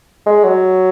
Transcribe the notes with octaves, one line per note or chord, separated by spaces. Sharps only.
G#3
F#3